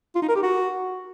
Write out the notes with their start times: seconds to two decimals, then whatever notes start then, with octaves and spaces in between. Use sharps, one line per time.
0.15 F4
0.22 D#4
0.29 A#4
0.36 G4
0.43 F#4